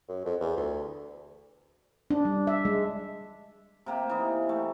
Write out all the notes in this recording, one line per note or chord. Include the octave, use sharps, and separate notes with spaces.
F#2
F2
E2
D2
D4
G3
E5
G#3
C3 A#3 G4
E3 D#4
A3